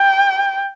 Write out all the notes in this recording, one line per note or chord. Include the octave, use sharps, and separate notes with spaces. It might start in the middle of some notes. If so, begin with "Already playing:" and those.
Already playing: G5